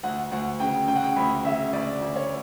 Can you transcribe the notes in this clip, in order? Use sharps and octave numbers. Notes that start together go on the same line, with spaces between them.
D2 F#5
D2 F#5
C#3 G5
C#3 G5
F#5
G5
D2 B5
C#3 E5
D2 D5
D2
C#5